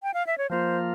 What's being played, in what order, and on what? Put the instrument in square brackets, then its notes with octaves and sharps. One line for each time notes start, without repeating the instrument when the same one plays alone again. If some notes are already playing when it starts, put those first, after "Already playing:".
[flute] G5
F5
E5
C#5
[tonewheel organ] F3 A#3 F4 [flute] C5